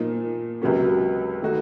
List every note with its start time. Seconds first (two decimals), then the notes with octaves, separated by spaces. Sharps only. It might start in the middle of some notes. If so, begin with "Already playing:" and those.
Already playing: A#2 F3 A#3 D#4
0.62 C#2 C3 F#3 A#3 C#4
1.42 D#3 A3 D#4 F#4